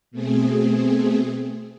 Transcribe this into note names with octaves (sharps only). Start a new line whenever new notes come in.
B2 A3 C4 G#4